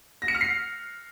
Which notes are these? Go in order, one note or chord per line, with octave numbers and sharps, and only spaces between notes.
A#6
C#7
F6
C7